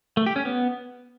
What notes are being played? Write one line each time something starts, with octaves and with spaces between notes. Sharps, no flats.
A3
G4
C#4
B3